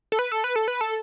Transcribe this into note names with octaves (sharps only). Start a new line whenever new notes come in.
A4
B4
A4
B4
A4
B4
A4